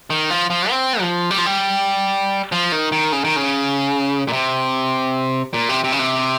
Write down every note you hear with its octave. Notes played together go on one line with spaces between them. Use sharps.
D#3
F3
F3
C4
F3
G3
F3
G3
F3
D#3
D#3
C#3
D#3
C#3
A#2
C3
A#2
C3
C3
C#3
C3